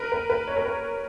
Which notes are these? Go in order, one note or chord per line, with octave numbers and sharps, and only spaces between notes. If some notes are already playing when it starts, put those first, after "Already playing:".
Already playing: A#4 B4
B4
B4
C#5
A#4
B4